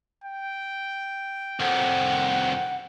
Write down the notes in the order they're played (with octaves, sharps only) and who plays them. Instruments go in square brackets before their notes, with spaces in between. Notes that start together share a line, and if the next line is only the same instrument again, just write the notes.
[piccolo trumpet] G5
[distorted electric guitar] C2 F2 [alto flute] F#5